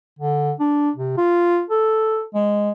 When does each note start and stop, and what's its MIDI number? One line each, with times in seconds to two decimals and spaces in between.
0.19 0.52 50
0.60 0.90 62
0.96 1.16 48
1.17 1.62 65
1.70 2.23 69
2.35 2.72 56